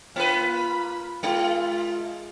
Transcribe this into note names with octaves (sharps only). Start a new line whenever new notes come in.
A#3 F4 B4 B5
G#3 F4